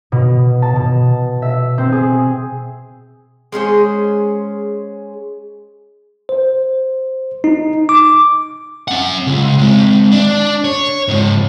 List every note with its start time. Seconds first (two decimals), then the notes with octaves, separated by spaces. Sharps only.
0.12 B2
0.62 A5
0.76 B2
1.42 E5
1.78 C4
1.92 G#4
3.52 G#3 C#4 G#4 C5
6.29 C5
7.44 D#4
7.89 D6
8.88 C#4 F#5
9.27 C#2
9.59 G#3 C4
10.12 D4
10.64 C#5
11.08 G#2 C#3